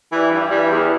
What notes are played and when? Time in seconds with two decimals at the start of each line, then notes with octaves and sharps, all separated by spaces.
0.12 E3 G3
0.30 G2
0.50 E3 G3
0.69 E2